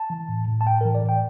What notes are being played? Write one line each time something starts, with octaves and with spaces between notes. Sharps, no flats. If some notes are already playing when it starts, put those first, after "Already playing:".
Already playing: A5
E3
A2
A2
A5
A2 G5
E3 A#4
D5
A2 G5